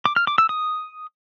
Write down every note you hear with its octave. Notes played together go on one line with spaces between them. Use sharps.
D6
F6
D6
E6
D#6